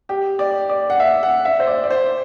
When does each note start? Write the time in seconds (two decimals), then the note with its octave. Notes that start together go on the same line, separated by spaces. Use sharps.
0.09 G4
0.39 D5
0.70 D5
0.90 F#5
1.00 E5
1.23 F#5
1.45 E5
1.60 C5
1.67 D5
1.84 D5
1.90 C5